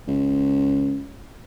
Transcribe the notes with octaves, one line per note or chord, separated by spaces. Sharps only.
C#2